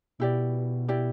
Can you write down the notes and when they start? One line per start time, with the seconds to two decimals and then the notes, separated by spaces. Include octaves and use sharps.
0.19 B2 E4 G4 D5
0.88 E4 G4 D5